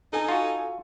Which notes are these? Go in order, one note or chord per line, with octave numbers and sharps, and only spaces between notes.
D#4 A4 G#5
F4 F#4